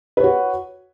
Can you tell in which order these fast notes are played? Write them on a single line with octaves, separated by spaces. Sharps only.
B4 C#5 F#4